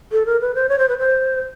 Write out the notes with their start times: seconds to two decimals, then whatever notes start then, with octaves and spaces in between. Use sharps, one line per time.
0.12 A4
0.26 A#4
0.40 B4
0.55 C5
0.69 C#5
0.79 C5
0.89 B4
0.98 C5